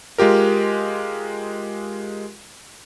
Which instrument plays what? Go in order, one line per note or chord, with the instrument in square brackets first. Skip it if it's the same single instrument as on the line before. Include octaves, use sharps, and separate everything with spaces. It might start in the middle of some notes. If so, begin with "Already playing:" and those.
[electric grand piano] G#3 F4 G4 A#4